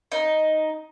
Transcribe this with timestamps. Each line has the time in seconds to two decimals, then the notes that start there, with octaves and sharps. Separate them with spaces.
0.12 D#4